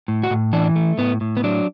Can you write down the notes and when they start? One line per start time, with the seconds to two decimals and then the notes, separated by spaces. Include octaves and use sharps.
0.08 A2
0.23 F#4
0.30 A2
0.53 E3 D4
0.75 A3
0.98 A2 B3
1.21 A2
1.37 B3
1.44 F#3 D4